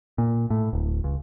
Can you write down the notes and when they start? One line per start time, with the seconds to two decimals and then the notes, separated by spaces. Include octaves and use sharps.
0.18 A#2
0.50 A2
0.73 D1
1.04 C#2